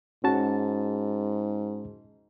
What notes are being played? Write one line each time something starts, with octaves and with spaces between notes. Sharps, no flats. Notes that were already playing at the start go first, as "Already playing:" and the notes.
G#2 C#4 F#4 A5